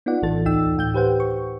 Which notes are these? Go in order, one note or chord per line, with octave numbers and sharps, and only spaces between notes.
B3 D#4 F4 D5 F#5
A#1 A2 E3 A4 A6
D2 D#4 G5 E6
A2 G5 G6
G4 B4 C5 F#5 G5
C#6